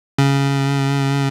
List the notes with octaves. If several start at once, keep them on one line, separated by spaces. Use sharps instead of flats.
C#3